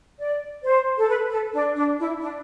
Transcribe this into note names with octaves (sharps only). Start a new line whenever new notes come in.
D5
C5
A4
B4
A4
D4
D4
E4
D4